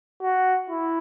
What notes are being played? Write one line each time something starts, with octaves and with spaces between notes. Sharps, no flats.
F#4
E4